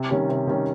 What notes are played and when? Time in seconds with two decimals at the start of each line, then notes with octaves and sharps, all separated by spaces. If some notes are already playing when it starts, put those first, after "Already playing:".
Already playing: C3
0.10 D#3 G3 C#4
0.29 C3
0.47 D#3 G3 C#4